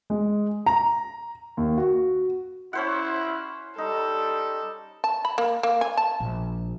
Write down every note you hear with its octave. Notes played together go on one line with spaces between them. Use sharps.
G#3
A#5
D#2
F#4
C#4 E4 C5 F#5
G3 D#4 A4
A5
B5
A#3
A#3
G#5
A5
A#1